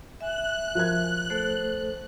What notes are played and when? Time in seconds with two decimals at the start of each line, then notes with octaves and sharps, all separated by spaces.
0.21 E5 G#5 F#6
0.75 F3 A#4 G#6
1.30 A3 A4 C5